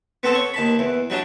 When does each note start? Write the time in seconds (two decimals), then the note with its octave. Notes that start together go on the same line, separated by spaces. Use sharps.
0.23 B3 C4 A4
0.35 C#5
0.54 D#2 A5 B5
0.79 E2
1.10 F#3 G3 D4